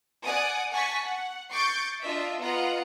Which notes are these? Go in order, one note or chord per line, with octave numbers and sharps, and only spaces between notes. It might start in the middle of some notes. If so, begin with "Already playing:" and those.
D5 F#5 G#5 D#6
F#5 G#5 A5 C#6 B6
F#5
C#6 D6 G6 A6 C7
D4 F4 D#5 E5
B3 F4 D#5 F#5 A#5